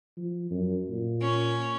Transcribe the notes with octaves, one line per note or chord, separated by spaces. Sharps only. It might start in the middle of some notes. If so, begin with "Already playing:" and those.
F3
F#2
A#2
C#4